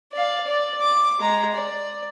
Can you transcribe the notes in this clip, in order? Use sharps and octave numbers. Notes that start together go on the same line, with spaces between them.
D5 F5
D5
D6
G#3 A#5
D5